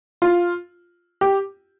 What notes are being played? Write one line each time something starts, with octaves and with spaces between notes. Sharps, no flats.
F4
G4